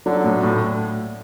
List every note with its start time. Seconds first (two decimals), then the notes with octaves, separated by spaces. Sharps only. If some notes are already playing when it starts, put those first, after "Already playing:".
0.06 D3 F#3
0.24 A2
0.43 A2